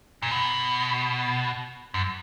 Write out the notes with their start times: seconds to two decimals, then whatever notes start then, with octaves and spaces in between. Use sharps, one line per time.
0.22 A#2
0.31 B2
1.94 F#2